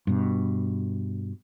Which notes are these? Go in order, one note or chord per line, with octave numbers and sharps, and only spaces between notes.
G2 B2